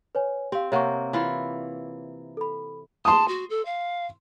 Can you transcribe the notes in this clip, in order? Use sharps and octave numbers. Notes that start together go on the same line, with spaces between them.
B4 C#5 G#5
C4 G4 F5
C3 A#3 C#5 F#5 C#6
E3 E4 F4
A4 B5
A5 C6 D#6
F#4
A4
F5